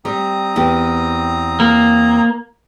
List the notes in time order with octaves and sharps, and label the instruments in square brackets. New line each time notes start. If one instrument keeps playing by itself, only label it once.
[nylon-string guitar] G3 [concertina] C4 A#5 D#6
[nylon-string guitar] E2 G4
[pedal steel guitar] A#3